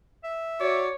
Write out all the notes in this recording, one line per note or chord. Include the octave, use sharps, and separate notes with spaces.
E5
F#4 C#5 D5